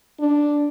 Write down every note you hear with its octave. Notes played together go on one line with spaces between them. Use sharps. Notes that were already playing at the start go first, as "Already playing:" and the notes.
D4